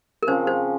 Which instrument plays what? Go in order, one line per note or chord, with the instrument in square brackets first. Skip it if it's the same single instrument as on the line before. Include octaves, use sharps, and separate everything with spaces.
[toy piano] A#4
[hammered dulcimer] C#3 F3 C4 [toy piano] C5
[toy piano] C5